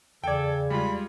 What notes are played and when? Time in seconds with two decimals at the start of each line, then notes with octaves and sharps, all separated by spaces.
0.24 E2 C#3 A4 D5 G5 G#6
0.70 G3 G#3 F4 B5